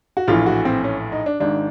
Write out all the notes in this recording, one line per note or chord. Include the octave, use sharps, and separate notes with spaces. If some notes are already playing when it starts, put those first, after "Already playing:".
F#4
A#1 A2 E3 F4
F#4
C4
C#4
D#4
D4
G#1 G#2 D#3 D4